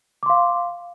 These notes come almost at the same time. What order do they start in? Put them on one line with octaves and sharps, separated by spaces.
D6 C6 F5